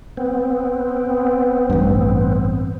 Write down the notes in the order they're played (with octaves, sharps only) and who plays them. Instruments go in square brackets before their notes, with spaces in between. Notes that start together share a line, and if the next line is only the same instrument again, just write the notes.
[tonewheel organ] B3 C4
[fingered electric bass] A1 G2